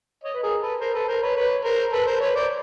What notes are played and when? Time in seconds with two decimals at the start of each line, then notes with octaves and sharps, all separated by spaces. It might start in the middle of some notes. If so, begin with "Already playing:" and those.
0.23 C#5 D#5
0.33 B4
0.42 G#4 A#4
0.61 A4 B4
0.80 A#4 C5
0.94 A4 B4
1.08 A#4 C5
1.22 B4 C#5
1.36 B4 C#5
1.64 A#4 C5
1.92 A4 B4
2.07 A#4 C5
2.21 B4 C#5
2.36 C5 D5